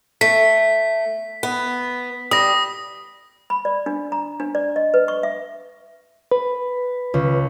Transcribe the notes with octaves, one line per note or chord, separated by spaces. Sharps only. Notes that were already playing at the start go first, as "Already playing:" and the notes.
A3 B6
B3
G3 D#6 A#6
B5
D5
D4
A#5
D4
D5
D#5
B4
C#6
E5
B4
C#2